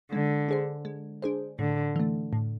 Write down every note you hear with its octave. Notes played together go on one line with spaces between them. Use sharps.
D3 G#3
D4 G#4 C5
G#3
D4 G#4 C5
A2 D3
E3 A3
A2